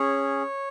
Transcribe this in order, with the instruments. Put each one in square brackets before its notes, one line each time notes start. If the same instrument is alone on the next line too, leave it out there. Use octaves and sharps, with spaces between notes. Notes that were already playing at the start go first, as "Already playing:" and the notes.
Already playing: [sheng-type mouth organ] C#4 G#4 C#5